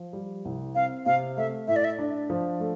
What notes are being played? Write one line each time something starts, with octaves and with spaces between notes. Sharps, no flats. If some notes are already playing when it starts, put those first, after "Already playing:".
Already playing: F3
G3
C2
C4 F5
C3 F5
A3 E5
A2 E5
D5
E5
D4
F3
A3